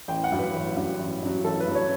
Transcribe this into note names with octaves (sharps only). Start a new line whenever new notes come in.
A1 G5
F#5
G2 F#3
B4
A1
G2 F#3
A1
G2 F#3
A1 A4
B4
G2 F#3
C#5